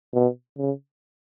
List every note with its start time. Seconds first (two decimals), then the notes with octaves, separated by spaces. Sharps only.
0.14 B2
0.58 C#3